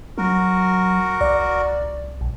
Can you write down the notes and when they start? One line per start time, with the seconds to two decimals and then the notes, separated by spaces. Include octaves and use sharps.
0.18 F#3 F#4 A#4
1.21 C2 D5
2.21 A#1